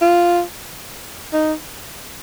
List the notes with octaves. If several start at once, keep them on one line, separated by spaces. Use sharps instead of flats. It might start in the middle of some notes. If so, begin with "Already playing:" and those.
F4
D#4